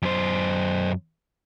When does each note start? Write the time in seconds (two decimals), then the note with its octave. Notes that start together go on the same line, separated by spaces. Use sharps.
0.03 F#2 C5